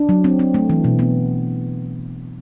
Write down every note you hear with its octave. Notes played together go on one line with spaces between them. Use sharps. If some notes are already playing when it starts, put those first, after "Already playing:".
Already playing: D4
F#3
C4
C4
A3
E3
B2
B3